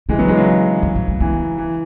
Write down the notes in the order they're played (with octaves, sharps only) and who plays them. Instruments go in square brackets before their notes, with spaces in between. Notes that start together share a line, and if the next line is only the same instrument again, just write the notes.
[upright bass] C#3 [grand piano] E3 G#3
[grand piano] F#3 B3
E3 G#3
C#3 F#3
[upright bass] E3
F#3
G#3
[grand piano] E3 [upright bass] B3
[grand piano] E3